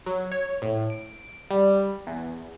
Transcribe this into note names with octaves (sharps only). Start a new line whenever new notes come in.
F#3
C#5
A2
D7
G3
E2